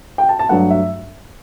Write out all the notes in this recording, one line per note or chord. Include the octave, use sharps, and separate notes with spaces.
G5
A5
A5
G2 F#3 A3 F#5
E5